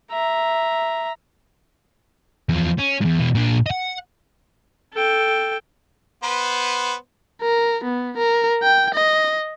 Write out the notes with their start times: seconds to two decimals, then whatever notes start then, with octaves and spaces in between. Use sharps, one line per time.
0.11 E5 A#5
2.49 E2 F3
2.79 C#4
3.01 E2 G#2
3.19 B2 E3
3.35 A#2 D4
3.66 D#5 F#5
4.93 A4 G5
6.23 B3 B4 C5
7.41 A#4
7.84 B3
8.17 A#4
8.62 G5
8.94 D#5